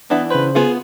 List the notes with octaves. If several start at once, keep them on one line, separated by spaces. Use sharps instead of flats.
E3 B3 D4 E4
C#3 B4 C5
B3 F4 G#4 F#5